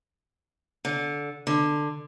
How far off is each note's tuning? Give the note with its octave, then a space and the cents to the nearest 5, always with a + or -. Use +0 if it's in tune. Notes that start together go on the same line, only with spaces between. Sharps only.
D3 -15
D3 +15